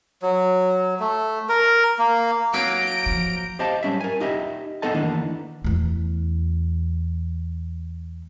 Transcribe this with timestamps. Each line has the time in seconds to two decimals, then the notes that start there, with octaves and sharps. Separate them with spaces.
0.23 F#3
1.00 A3
1.49 A#4
1.99 A#3
2.53 F#3 A#3 B4 A#5 G6 D7
3.06 F3
3.59 G4 C5 D#5 F5 A5
3.83 G3 C#4 E5
4.01 A#4 G#5
4.20 D#4 G4 D#5 E5
4.82 B3 D#4 G#4 A4 D#5 A5
4.94 D#3 E3 A#3 B3 D4
5.64 E2 A3